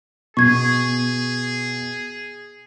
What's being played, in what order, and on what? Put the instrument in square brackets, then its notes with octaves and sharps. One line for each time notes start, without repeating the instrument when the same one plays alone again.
[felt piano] B2 [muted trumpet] G#4 [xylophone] C#6 G#6